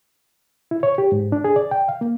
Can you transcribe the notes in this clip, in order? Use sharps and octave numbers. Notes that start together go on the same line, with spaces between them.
E4
C#5
G4
G#2
D4
G#4
D5
G5
F5
A#3